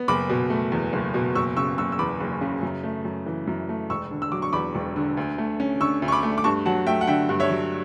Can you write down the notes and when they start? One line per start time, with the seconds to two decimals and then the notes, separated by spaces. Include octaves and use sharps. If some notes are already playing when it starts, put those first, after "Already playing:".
Already playing: B3
0.08 F#1 B5 D6
0.29 B2
0.50 A3
0.72 E2
0.93 F#1
1.14 B2
1.35 F#1 C#6 E6
1.57 C#3 C#6 E6
1.78 F#1 C#6 E6
1.92 E6
1.99 E2 B5 D6
2.20 F#1
2.41 C#3
2.63 F#2
2.84 A3
3.05 F#2
3.26 E3
3.47 F#2
3.69 A3
3.90 E1 C#6 E6
4.11 D3
4.22 E6
4.32 F#3 D6
4.42 C#6
4.53 E2 B5 D6
4.75 E1
4.96 D3
5.17 D2
5.38 A3
5.60 C#4
5.80 D3 C#6 E6
6.02 D2
6.08 C#6
6.12 B5 D6
6.23 A3
6.38 D6
6.44 G2 A5 C#6
6.66 F#3 F#5 A5
6.87 A3 E5 G5
7.01 F#5
7.07 D3 E5 G5
7.29 G2
7.40 C#5 E5
7.50 F#3